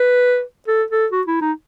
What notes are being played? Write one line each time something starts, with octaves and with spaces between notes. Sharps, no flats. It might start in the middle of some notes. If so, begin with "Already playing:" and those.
Already playing: B4
A4
A4
F#4
E4
D#4